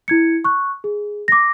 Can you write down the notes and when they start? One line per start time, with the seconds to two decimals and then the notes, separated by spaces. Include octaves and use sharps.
0.08 E4 G#6 C#7
0.44 C#6 F#6
0.84 G#4
1.28 D6 A#6